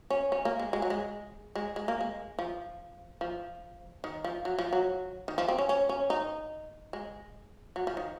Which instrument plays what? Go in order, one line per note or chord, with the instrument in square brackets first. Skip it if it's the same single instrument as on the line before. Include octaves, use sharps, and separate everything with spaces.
[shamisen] C#4
C#4
A#3
G#3
G#3
F#3
G#3
G#3
G#3
A#3
G#3
F3
F3
D#3
F3
F#3
F3
F#3
D#3
F3
C4
C#4
C#4
C#4
D#4
G#3
F#3
F3
D#3